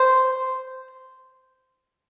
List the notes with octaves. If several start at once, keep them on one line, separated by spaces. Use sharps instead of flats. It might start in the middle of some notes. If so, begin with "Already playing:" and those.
Already playing: C5